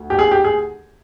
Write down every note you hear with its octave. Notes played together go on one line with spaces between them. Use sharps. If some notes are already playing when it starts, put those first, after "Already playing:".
Already playing: D2
G4
G#4
G4
G#4